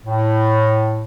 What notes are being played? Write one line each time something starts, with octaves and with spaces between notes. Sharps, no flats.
A2